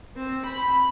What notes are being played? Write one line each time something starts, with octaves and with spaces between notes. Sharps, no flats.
C4
B5